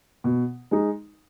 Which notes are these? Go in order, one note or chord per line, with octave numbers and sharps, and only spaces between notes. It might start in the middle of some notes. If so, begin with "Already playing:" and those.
B2
G#3 D#4